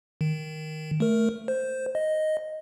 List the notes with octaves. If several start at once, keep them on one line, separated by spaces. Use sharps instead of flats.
D#3
A3 A#4
C5
D#5